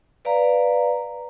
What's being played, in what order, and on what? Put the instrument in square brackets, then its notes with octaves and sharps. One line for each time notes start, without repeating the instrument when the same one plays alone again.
[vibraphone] B4 D5 F5 A#5